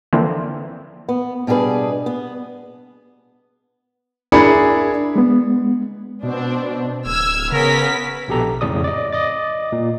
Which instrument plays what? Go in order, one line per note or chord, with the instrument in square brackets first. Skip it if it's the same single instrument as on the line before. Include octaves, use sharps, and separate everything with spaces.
[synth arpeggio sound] D3 E3 F3 A#3 C4
[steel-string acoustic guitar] B3
B2 G3 D4 G#4 B4
B3
[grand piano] D4 E4 G#4 A#4 B5 C#7
[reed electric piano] G#3 B3
[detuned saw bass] B2 [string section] C4 D4
[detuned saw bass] D1 [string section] E6 F6 G#6
[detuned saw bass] C#3 [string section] B3 B6 [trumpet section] C#4 G#4 A#4
[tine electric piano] A#1 B2 G4 A4 A#5
F2 A2 C#3 D5 D#6
D5 D#5
D#5 D6 A6
A#2